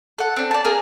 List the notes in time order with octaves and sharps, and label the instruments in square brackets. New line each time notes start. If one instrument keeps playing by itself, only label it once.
[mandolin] A4 F#5
C4 D4
D5 A5
A#3 G#4 A#4 G#5